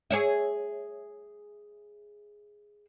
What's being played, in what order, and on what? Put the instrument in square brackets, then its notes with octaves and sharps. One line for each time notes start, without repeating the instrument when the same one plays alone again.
[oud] G#4 C#5 E5